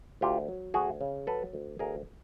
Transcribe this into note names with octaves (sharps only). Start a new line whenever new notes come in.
D2 F4 G4
F#3
D2 F#4 G#4
C#3
F#3 A4 B4
D2
D2 G#4 A#4